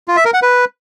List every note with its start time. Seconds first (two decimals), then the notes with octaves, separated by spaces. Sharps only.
0.08 F4
0.17 E5
0.25 A#4
0.34 F#5
0.42 B4